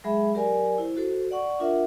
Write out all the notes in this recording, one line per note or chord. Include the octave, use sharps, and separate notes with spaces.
F#3 G#3 G#4 E5 B5
F#3 G4 A#4 D5 G#5
E4 C5
F#4 A4 C5
D5 F#5 C#6
D4 F4 A#4 E5 F#5